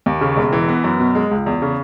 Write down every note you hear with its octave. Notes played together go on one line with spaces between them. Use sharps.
D#2
C#3
E1
E3
B3
F#2
B2
G#3
C#2
E2
C#3